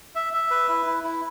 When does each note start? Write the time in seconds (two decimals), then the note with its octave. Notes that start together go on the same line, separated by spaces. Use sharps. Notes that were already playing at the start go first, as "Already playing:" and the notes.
0.15 E5
0.33 E5
0.51 B4
0.69 E4
0.86 E4
1.04 E4